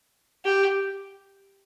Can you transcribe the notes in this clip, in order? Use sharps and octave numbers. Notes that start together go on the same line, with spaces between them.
G4